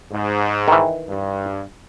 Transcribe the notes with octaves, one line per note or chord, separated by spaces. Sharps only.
G#2
D#3 E3
G2